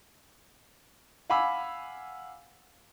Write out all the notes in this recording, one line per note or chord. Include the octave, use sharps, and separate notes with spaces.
F5 F#5 G#5 B5 D6 E6